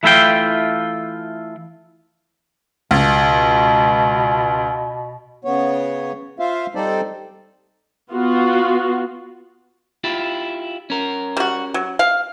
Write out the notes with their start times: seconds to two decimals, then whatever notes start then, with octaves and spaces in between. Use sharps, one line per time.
0.03 E3 A3 E4 F4 G5
2.91 C#2 B2
5.45 C#3 B3 C#5
6.40 F4 C5 E5 F5
6.75 G3 C4 D#4 A4 C5 D5
8.12 B3 F4 F#4
10.04 E4 F4 G4
10.90 C#4 A#4
11.37 G3 F#4
11.74 F#3
11.99 F5